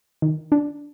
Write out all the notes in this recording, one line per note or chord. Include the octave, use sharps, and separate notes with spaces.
D#3
D4